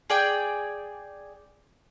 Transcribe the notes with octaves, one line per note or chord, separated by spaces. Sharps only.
G#4 D5 G5